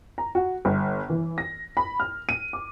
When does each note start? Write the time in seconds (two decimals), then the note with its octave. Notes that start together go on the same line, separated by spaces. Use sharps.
0.18 A#5
0.35 F#4
0.65 G1
1.10 E3
1.38 A#6
1.77 B5
2.00 F6
2.29 D#7
2.53 D6